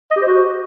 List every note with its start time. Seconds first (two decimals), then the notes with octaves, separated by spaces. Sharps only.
0.11 D#5
0.16 G4
0.22 C5
0.27 F#4